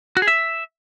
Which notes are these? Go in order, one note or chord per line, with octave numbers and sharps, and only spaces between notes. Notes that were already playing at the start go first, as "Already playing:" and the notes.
F#4
G#4
E5